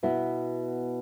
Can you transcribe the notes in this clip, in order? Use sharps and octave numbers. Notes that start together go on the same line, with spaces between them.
B2 B3 E4